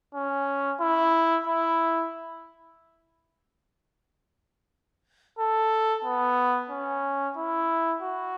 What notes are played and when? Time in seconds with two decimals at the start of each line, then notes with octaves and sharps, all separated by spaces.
0.15 C#4
0.81 E4
1.47 E4
5.39 A4
6.05 B3
6.70 C#4
7.37 E4
8.02 F#4